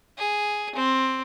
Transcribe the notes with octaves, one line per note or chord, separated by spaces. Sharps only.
G#4
C4